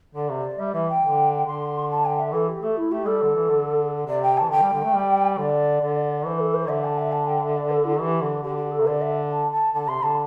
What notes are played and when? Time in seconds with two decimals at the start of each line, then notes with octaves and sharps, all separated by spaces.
0.15 D3 D5
0.30 C3
0.37 D5
0.58 G3 E5
0.73 E3 E5
0.88 G5
1.02 D3
1.46 D3 C6
1.90 A5
2.05 G5
2.18 E5
2.32 E3 A4
2.48 G4
2.62 A3 A4
2.76 E4
2.91 A3 G4
3.06 G3 A4
3.23 D3
3.35 E3
3.49 D3
4.07 C3 D5
4.22 G5
4.37 A5
4.42 E3
4.51 D3 G5
4.62 G3
4.73 D3
4.84 A3
4.95 G3
5.38 D3 D5
5.81 D3
6.25 E3 C5
6.39 A4
6.54 C5
6.68 D3 E5
6.83 A5
6.98 E5
7.12 A5
7.26 G5
7.41 E5
7.56 D5
7.70 A4
7.84 E4
7.93 A4
7.99 E3 G4
8.21 D3
8.43 D3 G4
8.57 G4
8.71 A4
8.80 C3
8.86 D3 D5
9.01 E5
9.29 A5
9.51 A5
9.73 D3 A5
9.88 C3 C6
10.02 D3 A5